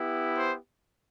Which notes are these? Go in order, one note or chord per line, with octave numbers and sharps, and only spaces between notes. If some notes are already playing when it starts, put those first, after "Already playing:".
Already playing: B3 E4 G4
C5